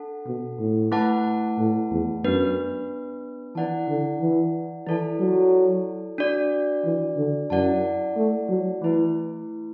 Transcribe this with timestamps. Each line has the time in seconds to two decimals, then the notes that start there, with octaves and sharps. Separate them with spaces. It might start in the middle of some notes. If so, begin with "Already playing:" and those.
Already playing: D4 A4 F#5 A5
0.26 B2
0.59 A2
0.92 A3 E4 B4 F#5 A5
1.58 A2
1.91 E2
2.24 F#2 B3 D4 B4
3.55 E3 E4 D5 F#5 A5
3.88 D3
4.21 E3
4.87 E3 E4 A4 D5 A5
5.20 F#3
6.18 D4 F#4 D5
6.85 E3
7.17 D3
7.50 F#2 E4 D5 F#5 A5
8.17 A3
8.49 F#3
8.82 E3 A3 E4 B4